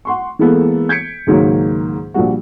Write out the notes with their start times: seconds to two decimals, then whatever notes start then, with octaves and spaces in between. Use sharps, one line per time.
0.05 F#5 C6 C#6
0.39 E3 G#3 A#3 B3 A4
0.89 G6 G#6 B6 C#7 D7
1.27 C#2 G#2 D#3 F#3 G#3 A#3
2.14 A#1 F3 G3 F#4